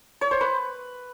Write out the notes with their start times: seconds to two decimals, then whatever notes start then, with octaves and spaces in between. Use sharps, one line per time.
0.21 C#5
0.31 C5
0.41 B4